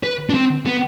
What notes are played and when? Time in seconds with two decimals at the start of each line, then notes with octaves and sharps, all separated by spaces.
0.03 B4
0.30 D4
0.34 C4
0.66 B3